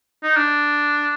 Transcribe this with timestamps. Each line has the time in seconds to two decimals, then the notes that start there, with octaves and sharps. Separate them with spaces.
0.23 D#4
0.36 D4